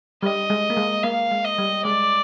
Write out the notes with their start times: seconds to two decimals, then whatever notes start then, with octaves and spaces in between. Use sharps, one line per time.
0.23 G3 D#5
0.50 G#3
0.70 A#3
0.77 G#3
1.04 A#3 F5
1.31 G#3
1.44 D#5
1.58 G3
1.85 G#3 D5